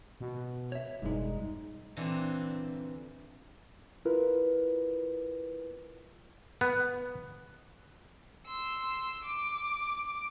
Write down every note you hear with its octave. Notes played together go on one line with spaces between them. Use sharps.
B2
C#5 E5
E1 G2 G#3 D#4
A#2 D3 E3 C4
E4 F4 A#4 B4
B3
C6 E6
D6